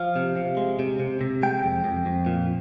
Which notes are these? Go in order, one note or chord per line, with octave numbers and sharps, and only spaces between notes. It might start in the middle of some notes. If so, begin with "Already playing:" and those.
Already playing: F3 F5
C3
C3
G#3
C3
C3
C3
G#3 G5
F2
F2
F2
A#2